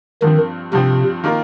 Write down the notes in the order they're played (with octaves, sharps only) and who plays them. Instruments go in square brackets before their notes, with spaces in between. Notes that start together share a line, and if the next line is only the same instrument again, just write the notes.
[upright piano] G2 F3 C4 [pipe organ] D#3
[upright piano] G2 F3 C4 [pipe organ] C3
[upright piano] D#3 A#3 F4 A#4